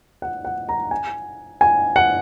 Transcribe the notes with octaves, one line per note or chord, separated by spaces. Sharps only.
F#5
F#5
A#5
G#5
G#5
F#5